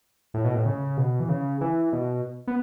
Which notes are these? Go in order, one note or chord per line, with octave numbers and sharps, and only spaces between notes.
A2
B2
A2
C#3
B2
E3
C#3
E3
B2
B3